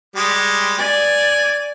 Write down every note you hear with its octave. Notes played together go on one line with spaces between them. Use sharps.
G3 G#3 G4
D5 G#5